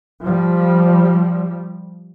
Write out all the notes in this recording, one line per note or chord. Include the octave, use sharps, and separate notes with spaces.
F3 G3